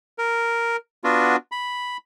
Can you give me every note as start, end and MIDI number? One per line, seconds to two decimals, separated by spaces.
0.18 0.76 70
1.04 1.36 59
1.04 1.36 62
1.04 1.36 65
1.04 1.36 66
1.52 1.97 83